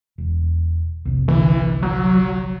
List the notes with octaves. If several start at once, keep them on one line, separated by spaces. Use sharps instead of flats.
E1
F1 C2
G1 C2 D3 E3
F#3